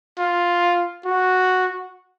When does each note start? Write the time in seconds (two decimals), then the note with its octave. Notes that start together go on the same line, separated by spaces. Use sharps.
0.18 F4
1.05 F#4